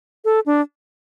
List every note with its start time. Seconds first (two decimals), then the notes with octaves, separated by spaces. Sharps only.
0.25 A4
0.46 D4